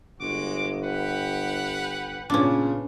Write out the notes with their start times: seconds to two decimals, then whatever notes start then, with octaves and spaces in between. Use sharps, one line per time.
0.20 G1 G#3 F#4 D6
0.84 G4 B4 F#5
2.30 A#2 C#3 B3 C#4 D4